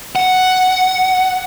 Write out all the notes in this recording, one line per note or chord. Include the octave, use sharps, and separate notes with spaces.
F#5